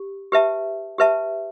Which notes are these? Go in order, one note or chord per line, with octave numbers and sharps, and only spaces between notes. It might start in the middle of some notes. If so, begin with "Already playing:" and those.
Already playing: G4
G4 B4 E5 A5
G4 B4 E5 A5